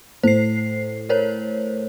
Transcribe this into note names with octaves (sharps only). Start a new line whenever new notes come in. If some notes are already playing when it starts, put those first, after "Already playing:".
A2 C5 C7
A#4 C5 C#5